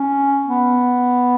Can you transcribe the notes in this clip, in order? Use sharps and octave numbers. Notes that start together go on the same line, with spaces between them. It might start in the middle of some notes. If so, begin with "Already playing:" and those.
Already playing: C#4
B3